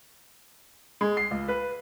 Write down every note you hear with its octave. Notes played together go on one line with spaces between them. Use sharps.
G#3
C7
C#2
B4